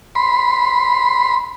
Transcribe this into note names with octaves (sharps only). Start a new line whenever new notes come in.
B5 C6